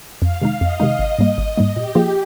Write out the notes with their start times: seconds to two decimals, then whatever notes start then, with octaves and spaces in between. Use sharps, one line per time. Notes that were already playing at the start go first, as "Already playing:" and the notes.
0.22 F2 F5
0.42 C3 D#3 G#3 D#4
0.60 F2 D#5
0.80 C3 D#3 G#3 D#4
0.99 G#1
1.19 G#2 G3 A#3
1.38 G#1
1.57 G#2 G3 A#3
1.76 A#2 G4
1.95 F3 A#3 F4 G#4